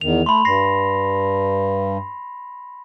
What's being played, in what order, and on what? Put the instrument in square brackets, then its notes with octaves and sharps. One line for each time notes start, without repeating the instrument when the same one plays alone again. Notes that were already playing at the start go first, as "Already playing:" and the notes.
[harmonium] E2 D#3 [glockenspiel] F7
[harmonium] A3 [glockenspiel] B5 C6
[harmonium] G2 [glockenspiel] A#6 C7